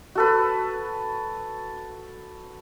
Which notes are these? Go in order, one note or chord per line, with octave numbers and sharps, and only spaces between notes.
F#4 A4 B4